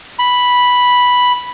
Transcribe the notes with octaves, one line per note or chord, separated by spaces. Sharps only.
B5